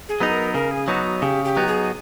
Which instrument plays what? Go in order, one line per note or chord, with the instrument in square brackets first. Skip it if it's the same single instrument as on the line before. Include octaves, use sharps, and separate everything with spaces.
[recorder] G#4
[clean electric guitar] F#3 B3 D#4
[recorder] A#4
[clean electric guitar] C#3 [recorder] A#4
[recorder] G#4
[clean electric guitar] F#3 B3 D#4 [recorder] F#4
[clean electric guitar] C#3 [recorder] G4
[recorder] G4
[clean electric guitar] F#3 B3 D#4
[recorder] G#4